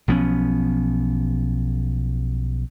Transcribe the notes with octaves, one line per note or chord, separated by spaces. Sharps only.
B1 F3 B3 C#4